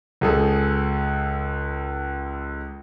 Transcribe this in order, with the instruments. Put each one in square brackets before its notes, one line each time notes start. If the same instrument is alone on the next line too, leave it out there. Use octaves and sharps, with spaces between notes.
[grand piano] C#2 G#4 A4